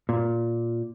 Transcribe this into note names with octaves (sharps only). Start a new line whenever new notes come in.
A#2